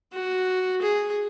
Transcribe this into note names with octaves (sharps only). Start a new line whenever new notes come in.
F#4
G#4